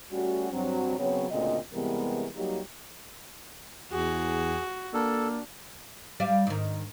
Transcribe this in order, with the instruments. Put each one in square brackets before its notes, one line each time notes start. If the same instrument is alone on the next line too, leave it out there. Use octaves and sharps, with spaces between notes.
[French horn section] G3 A3 C#4 F#4
G2 F#3 C4
C#3 F#3 B3 C4 C#5
D2 A#2 C#3 C4 D#5
C3 E3 G3 G#3 B3 A#4
F#3 G3 A#3 D#4 G4
[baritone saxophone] E2 [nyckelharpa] F#4 [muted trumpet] G#4
[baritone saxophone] A#3 [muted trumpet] D4 [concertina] A4
[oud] G3 D5 F5
G#2 D#3